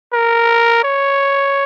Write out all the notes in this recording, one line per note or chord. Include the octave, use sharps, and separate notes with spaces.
A#4
C#5